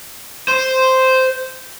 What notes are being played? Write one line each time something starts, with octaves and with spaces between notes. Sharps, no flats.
C5